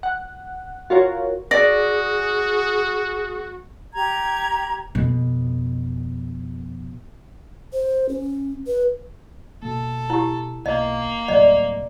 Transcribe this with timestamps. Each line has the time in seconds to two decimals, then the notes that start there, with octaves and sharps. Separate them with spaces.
0.03 F#5
0.90 F4 F#4 A#4 C#5
1.51 F#4 G#4 D5 A#6
3.94 G4 A#5 G#6
4.95 F2 B2
7.73 C5
8.09 C#4
8.67 B4
9.62 B2 A#3 A4
10.10 E4 G4
10.66 B1 A#3 D#5
11.28 D1 C2 F#3 D5 D#5